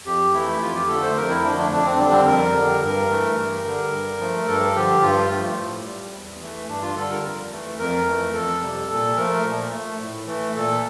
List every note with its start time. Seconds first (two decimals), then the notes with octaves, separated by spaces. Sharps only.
0.05 F2 G4
0.33 E3 A3 E4
0.61 F2 F4
0.74 G4
0.88 D3 A3 A4
1.03 C5
1.15 F2 A#4
1.29 E4
1.43 D3 F3 A3 D4
1.58 D4
1.71 F2 D4
1.85 C4
1.98 D3 G3 D4
2.12 C4
2.27 F2 A#4
2.54 D3 G3
2.82 G2 A#4
3.10 E3 A3
3.37 G2
3.64 D3 G3
3.92 G2
4.19 F3 A3
4.47 G2 A4
4.75 D3 F3 G4
5.02 G2 F4
5.31 F3 A3
5.58 A2
5.85 G3
6.13 E2
6.40 E3 A3
6.68 G2 D4
6.82 F4
6.96 D3 G3 A4
7.10 A#4
7.24 F2
7.52 E3 A3
7.78 F2 A#4
8.06 E3 A3
8.34 F2 A4
8.62 C3 G3
8.89 A#2 A4
9.16 F3 A3 A#4
9.44 A#2
9.72 A3
9.99 A2
10.27 E3 A3
10.55 A#2 A4